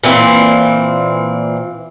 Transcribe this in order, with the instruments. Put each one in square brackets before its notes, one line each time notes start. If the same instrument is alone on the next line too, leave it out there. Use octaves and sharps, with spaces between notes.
[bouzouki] A#2 E3 C4